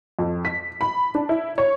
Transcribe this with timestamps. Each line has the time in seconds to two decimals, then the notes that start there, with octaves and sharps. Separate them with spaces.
0.19 F2
0.45 B6
0.81 B5
1.15 D4
1.29 E4
1.58 C#5